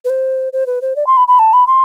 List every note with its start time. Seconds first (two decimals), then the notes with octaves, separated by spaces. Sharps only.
0.05 B4
0.10 C5
0.53 C5
0.67 B4
0.82 C5
0.96 D5
1.07 C6
1.17 B5
1.28 B5
1.39 A5
1.53 B5
1.67 C6